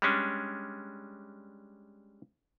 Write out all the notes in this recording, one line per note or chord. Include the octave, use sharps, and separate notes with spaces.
G3 G#3 C#4 D4